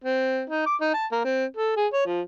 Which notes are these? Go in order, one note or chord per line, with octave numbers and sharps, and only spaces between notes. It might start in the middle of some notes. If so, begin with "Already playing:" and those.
C4
D#4
D6
D#4
A5
A#3
C4
A4
G#4
C#5
F3